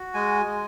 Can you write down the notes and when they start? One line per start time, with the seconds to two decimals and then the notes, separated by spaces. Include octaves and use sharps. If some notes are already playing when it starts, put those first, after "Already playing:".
Already playing: F#4
0.14 G#3 G#5
0.45 G#3